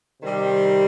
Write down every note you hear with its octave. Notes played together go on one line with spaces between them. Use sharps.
C3 D#3 G3 C4